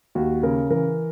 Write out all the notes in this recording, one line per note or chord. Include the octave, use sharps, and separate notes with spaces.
D#2 F#4
C#3 A#4
E3 A#4